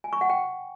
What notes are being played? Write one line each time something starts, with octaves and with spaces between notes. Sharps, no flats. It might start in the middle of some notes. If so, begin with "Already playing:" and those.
G#5
C#6
F#5
G5